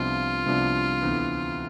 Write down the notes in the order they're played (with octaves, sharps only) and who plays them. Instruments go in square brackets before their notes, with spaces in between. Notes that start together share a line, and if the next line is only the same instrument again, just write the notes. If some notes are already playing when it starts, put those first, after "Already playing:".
Already playing: [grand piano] C2 C3 F3 B3 D4 [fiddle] F4
[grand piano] C2 C3 F3 B3 D4
D2 C3 E3 B3